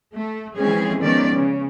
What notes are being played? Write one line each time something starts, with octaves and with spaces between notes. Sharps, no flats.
A3
E3 F3 G#3 C4 C#4 G#4
D#3 F3 G#3 B3 C#4 D5
C#3